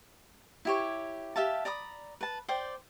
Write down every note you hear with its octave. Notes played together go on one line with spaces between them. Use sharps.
E4 G4 C#5
G4 E5 F5 A5
D5 A#5 B5 D#6
B4 A5
C5 D5 G5